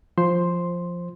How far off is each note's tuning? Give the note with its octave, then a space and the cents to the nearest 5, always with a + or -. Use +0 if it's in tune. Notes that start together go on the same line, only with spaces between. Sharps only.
F3 +0 C5 +10 C6 +0